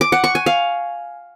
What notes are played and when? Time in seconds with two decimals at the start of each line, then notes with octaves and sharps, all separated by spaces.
0.01 D6
0.12 F#5
0.24 C#6
0.35 G#5
0.46 F5